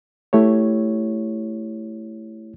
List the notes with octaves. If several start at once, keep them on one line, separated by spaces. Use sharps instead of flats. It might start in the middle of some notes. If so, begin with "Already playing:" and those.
A3 E4 G4 C#5